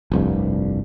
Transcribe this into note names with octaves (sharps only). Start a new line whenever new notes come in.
F1 C2 G2